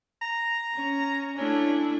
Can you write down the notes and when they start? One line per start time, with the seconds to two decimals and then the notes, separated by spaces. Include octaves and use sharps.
0.21 A#5
0.75 C#4
1.38 A3 C#4 D4 E4